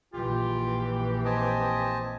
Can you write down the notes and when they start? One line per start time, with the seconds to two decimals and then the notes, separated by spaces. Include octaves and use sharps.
0.13 A#1 E3 F4 G4
1.25 C4 D#5 G#5 A5